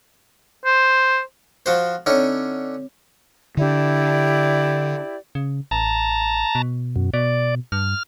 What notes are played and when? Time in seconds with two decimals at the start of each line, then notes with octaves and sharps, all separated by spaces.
0.65 C5
1.66 F3 F#4 C5
2.06 D3 C4 C#4 D#4 C#5
3.57 D3 D4 E4 G4 D5
5.35 C#3
5.71 A1 A5 A#5
6.55 B2
6.96 F#2
7.14 B2 D5
7.72 G2 F6